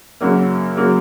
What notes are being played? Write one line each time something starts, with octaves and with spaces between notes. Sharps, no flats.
F#2 C#3 F#3 A#3
C#3 F#3 A#3